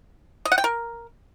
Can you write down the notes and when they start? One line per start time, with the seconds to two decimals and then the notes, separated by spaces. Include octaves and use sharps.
0.45 D#5
0.52 F#5
0.58 G5
0.64 A#4